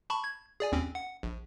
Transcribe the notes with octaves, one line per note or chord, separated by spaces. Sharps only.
A5 B5 C#6
G#6
G#4 D5 G#5
D#2 C4 C#4
F#5
A#1